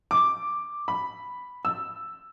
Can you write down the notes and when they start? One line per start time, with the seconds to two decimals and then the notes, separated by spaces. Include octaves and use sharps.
0.11 D6
0.88 B5
1.65 E6